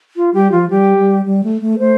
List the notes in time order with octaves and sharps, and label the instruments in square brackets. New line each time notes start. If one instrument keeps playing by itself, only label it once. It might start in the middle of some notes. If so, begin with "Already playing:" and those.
[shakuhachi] F4
[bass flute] G3 [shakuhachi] G4
[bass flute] F3 [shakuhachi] F4
[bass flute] G3 [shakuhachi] G4
[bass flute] G3
G3
A3
A3
[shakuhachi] A4
[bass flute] A3 [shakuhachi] C5